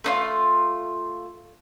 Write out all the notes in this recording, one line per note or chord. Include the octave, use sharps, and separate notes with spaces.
A3 D#4 F4